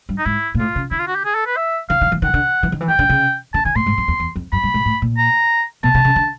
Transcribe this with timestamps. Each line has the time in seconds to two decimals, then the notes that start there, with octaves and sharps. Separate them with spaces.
0.09 G2
0.18 D#4
0.26 G#2 E4
0.55 A#2
0.59 A2 F4
0.76 C#3
0.91 D3 E4
0.99 F4
1.07 F#4
1.15 G4
1.25 G#4
1.35 A4
1.47 B4
1.56 E5
1.89 D#3 F5
2.01 D#3
2.12 E3
2.22 D#3 F#5
2.34 D3
2.63 E3
2.72 D#3
2.81 E3
2.88 D#3 G5
2.99 D3
3.09 C#3
3.53 D3 A5
3.65 D#3 G#5
3.75 A2 C6
3.86 G#2
3.98 F2
4.08 E2
4.20 E2
4.36 F2
4.52 F#2 B5
4.63 G2
4.74 G#2
4.85 A2
5.02 A#2
5.17 A#5
5.83 B2 A5
5.94 C3
6.05 C#3
6.16 D3